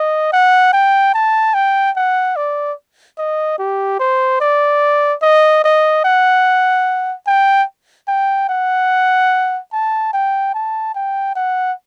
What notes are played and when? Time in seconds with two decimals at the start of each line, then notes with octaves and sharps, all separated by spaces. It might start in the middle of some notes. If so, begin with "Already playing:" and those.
Already playing: D#5
0.33 F#5
0.73 G5
1.14 A5
1.54 G5
1.96 F#5
2.36 D5
3.18 D#5
3.59 G4
4.00 C5
4.40 D5
5.22 D#5
5.64 D#5
6.05 F#5
7.27 G5
8.08 G5
8.49 F#5
9.72 A5
10.13 G5
10.54 A5
10.95 G5
11.35 F#5